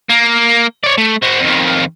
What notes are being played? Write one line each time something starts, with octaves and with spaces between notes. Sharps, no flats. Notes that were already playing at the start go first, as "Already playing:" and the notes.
A#3
C#5 D5
A3
C4 F#4
F2 D#3